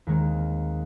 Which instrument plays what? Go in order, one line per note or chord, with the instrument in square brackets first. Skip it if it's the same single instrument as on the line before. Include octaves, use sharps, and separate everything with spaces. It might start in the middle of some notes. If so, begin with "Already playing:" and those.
[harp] D#2 D#3 G#3 C4